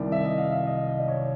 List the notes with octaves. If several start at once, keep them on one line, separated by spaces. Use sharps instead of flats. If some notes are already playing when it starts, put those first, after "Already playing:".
Already playing: C2 C3 D#3 D5
E5
D#5
F5
E5
D#5
D#5
D5
C#5